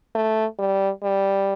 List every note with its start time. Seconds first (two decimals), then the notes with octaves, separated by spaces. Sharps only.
0.15 A3
0.59 G3
1.03 G3